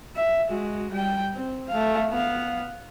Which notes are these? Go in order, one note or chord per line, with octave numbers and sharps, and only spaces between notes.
E5
G#3 F#4
G3 G5
C4
A3 F5
B3 F5